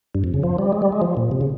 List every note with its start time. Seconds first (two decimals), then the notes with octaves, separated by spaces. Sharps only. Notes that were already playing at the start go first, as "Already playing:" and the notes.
0.15 G2
0.24 F2
0.34 C#3
0.43 F3
0.59 G3
0.73 G#3
0.82 G3
0.92 G#3
1.02 F3
1.17 A#2
1.31 C3
1.41 C#3